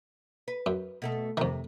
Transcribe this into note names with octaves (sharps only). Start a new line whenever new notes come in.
B4
F#2
B2 A3 A4
F2 C3 D#3